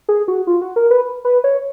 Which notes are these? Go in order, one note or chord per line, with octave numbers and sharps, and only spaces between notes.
G#4
F#4
F4
F#4
A#4
B4
B4
C#5